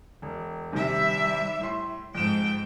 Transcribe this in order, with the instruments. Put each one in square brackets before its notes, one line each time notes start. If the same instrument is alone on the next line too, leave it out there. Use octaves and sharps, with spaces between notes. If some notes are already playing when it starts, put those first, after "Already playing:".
[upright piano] E1
[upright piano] A#1 C3 D#3 [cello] G3 E5
[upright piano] A2 C6
[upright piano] F2 E7 [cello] G#2 G5